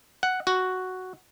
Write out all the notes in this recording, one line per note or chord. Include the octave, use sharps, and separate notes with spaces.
F#5
F#4